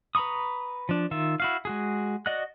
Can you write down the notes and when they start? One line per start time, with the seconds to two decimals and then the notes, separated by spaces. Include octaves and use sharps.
0.15 B4 A#5 B5 C#6 D#6
0.89 F3 D4
1.11 D#3 F4 E5
1.40 E4 F#4 F5
1.65 G#3 F#4 G#4
2.26 F#4 D5 D#5 F#5 F#6